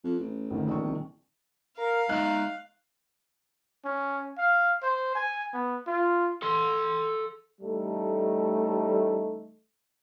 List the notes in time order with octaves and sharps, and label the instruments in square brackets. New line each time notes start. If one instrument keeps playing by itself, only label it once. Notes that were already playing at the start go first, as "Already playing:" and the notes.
[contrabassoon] F2
A1
[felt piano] G#1 D2 D#3
A#1 D#3 C#6
[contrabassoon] C2
[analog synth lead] A#4 [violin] F5
[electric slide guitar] G#3 E5 [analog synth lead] D#4 [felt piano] F#6
[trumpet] C#4
F5
C5
G#5
B3
F4
[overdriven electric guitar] A4 C6
[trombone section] A1 G3 A3 D#4 A4